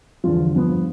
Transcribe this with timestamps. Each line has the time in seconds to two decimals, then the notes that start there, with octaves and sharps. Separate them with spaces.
0.24 E2 D3 F3 F4
0.53 G2 F3 B3